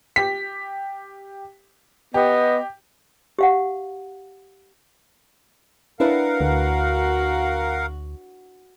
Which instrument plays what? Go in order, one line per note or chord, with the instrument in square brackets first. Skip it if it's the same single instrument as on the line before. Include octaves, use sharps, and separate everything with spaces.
[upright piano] G4 B6
[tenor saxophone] B3 [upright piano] G4 [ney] D#5
[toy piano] G4 F5 F#5
[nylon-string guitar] D4 E4 B4 [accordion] A#4 F5 F#5
[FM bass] D2 [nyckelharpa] F#4